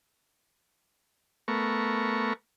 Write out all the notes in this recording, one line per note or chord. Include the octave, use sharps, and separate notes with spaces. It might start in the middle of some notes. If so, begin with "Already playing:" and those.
A3 B3 A#4 C#6